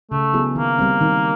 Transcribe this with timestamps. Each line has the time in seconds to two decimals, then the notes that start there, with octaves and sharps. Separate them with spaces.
0.11 C#3 A3
0.33 F#3 B3 E4 G#4
0.55 D#3 A#3
0.79 G3 C4
1.01 D#3